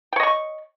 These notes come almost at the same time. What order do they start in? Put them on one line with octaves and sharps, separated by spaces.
G5 C#5 D#5 C#6